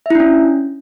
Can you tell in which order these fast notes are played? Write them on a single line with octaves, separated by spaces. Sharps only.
E5 E4 D4 C#4